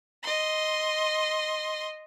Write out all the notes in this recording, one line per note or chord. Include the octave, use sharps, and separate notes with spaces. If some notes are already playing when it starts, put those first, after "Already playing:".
D#5 C6